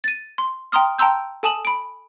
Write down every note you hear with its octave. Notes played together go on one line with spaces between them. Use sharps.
A6 D#7
C6
G5 A#5 C6 D#6 F6
G5 A5 A#5 C6 E6 G6
A4 G#5 A5 D#6 E7 F#7
B5 D7